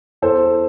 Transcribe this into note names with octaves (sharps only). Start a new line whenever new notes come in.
E2 A4 C5